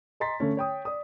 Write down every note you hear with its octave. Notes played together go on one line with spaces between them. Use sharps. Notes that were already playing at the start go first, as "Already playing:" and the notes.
D#5 G#5 A#5 C6 A6 B6
D3 A3 C#4
C#5 G5 D#6
D5 D#6